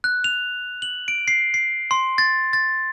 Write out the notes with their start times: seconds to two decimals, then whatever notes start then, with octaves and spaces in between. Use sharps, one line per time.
0.04 F#6
0.24 F7
0.82 F#7
1.08 D7
1.28 C7
1.54 C7
1.91 C6
2.18 A6
2.53 A6